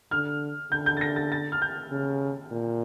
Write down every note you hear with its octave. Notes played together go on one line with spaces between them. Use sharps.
D3 F6
D3 G6
G6
A6
A#6
A6
A6
F6
G6
C#3
A#2